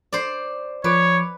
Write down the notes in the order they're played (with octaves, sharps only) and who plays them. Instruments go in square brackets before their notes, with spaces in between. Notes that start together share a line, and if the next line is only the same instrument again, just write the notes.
[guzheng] C5 D5
[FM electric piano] F3 D6 [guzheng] B4 [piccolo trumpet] C#5